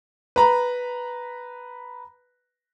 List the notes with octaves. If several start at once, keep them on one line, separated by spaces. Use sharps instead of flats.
B4 A#5 B5